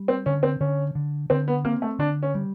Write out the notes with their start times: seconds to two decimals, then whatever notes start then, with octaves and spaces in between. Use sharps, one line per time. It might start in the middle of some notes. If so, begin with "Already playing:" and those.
Already playing: G3
0.08 C4
0.26 D3 C#4
0.43 C4
0.61 D3 C#4
0.95 D3
1.30 D3 C4
1.48 B3
1.65 A#3 C4
1.82 A3
1.99 D3 D4
2.23 C#4
2.35 G3